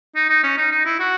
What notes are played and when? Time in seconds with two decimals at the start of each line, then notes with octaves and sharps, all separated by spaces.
0.16 D#4
0.30 D#4
0.44 C#4
0.57 D#4
0.72 D#4
0.85 E4
1.00 F#4